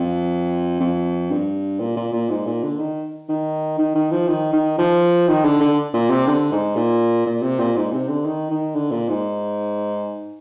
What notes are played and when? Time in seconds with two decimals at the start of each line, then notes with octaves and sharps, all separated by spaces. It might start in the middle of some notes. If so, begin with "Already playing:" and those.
Already playing: F2
0.80 F2
1.31 G2
1.80 A#2
1.96 A#2
2.13 A#2
2.30 G#2
2.46 A#2
2.63 D3
2.79 D#3
3.29 D#3
3.78 D#3
3.95 D#3
4.11 F3
4.28 D#3
4.53 D#3
4.78 F3
5.28 D#3
5.45 D3
5.60 D3
5.94 A#2
6.10 C3
6.27 D3
6.52 G#2
6.76 A#2
7.26 A#2
7.42 C3
7.60 A#2
7.76 G#2
7.92 C3
8.09 D3
8.25 D#3
8.51 D#3
8.75 D3
8.91 A#2
9.09 G#2